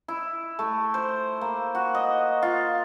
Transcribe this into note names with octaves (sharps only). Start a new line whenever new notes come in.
E4
A3
C5
A#3
F#4
D#5
F4